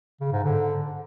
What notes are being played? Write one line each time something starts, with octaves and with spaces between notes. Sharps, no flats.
C#3
G#2
D3